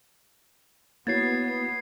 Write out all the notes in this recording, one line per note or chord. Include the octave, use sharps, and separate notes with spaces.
A#3 B3 E4 F#4 C#5 G#6 A6 C7